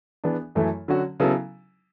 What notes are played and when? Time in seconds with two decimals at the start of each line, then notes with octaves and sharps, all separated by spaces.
0.24 E3 B3 D4 G#4
0.55 F#2 E3 A3 E4 A4
0.88 D3 F#3 C#4 F#4
1.20 C#3 F#3 B3 E4 A4